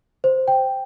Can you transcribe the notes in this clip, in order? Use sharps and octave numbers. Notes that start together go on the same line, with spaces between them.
C5
G5